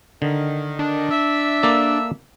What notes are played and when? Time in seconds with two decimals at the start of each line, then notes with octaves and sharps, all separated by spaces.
0.22 D3 D#3
0.79 D4
1.10 E5
1.63 A#3 A4 D5